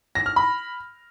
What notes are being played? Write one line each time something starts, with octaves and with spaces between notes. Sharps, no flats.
A#6
F6
B5